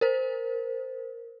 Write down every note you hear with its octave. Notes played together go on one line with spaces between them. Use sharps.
A#4 C5